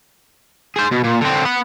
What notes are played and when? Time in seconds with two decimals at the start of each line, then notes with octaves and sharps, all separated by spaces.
0.76 G#4 C5
0.92 B2
1.04 A#2
1.21 D3 C4
1.45 B3 F#5